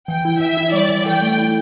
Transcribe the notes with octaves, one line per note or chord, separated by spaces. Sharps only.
E3 G5
E4
E3 E5
E4
G3 D5
E3
A4 G5
A3
E4